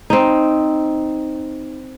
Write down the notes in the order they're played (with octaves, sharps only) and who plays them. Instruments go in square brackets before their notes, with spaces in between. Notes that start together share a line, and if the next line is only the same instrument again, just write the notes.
[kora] C4 D#4